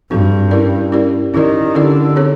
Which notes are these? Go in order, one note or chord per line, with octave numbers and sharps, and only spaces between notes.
G2 C4 D#4 F#4 A4
C#4 E4 G4 A#4 D5
C#4 E4 G4 A#4 D5
D#3 C#4 E4 G4 A#4 D5
D3 C#4 E4 G4 A#4 D5
C4 D#4 G#4 C#5